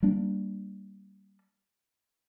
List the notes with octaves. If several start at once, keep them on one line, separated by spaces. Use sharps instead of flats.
G3 A#3 D4